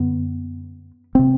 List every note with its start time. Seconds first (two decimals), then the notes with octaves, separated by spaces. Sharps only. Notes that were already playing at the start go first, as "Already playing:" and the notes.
Already playing: F#2 D3 B3
1.15 C3 C4